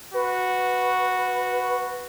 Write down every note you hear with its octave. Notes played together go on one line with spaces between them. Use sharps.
F#4 B4